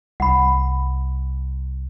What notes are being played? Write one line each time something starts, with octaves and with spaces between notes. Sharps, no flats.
C2 F#5 B5